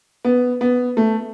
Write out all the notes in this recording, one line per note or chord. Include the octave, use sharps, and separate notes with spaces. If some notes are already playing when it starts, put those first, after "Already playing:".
B3
B3
A3